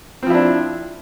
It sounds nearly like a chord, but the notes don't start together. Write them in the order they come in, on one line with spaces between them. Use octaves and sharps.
C4 F3 E4 D4